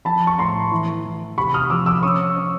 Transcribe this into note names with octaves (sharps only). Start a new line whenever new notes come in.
F3 A5 B5
C#6
A2 A#5 C6
E3
E3
C3 B5 C#6
D#6 F6
F3 D6 E6
D6 E6
C#4 C#6 D#6
C#4